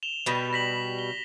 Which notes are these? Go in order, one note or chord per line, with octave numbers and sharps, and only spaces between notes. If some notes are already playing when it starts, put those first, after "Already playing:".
E7 F7 G7
B2 G3
A#6 B6 F#7
G7